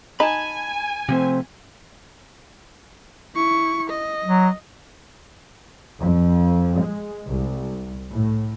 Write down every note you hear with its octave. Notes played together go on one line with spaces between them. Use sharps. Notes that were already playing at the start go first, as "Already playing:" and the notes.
D#4 G#5 A5 B5
C3 F3 A3 C4
E4 C#6
D#5
F#3
F2
G#3
C2
A2